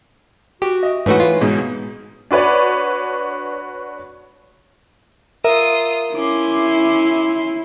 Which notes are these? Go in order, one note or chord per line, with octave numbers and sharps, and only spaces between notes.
F#4 G4
D#5 E5
G#2 E3 A3 C#4 D#4 F#4 B4
F4
G#2 B2 G#4
D4 F#4 B4 C#5 D5
F4 A#4 E5 D#6
C#4 E4 C6 D6